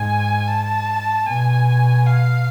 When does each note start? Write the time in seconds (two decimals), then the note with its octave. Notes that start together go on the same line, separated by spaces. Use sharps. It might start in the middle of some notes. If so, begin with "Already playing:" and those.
Already playing: G#2 G#5
0.48 A5
1.27 B2 G#5
2.06 F5